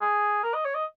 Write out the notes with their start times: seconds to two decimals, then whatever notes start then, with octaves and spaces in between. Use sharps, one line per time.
0.01 G#4
0.44 A#4
0.54 D#5
0.65 C#5
0.75 D#5